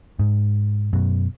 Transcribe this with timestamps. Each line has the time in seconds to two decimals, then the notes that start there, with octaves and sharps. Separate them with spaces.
0.19 G#2
0.93 F#2 B2